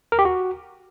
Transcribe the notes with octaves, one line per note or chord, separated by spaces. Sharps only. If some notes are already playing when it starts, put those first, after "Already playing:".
A#4
G4
F#4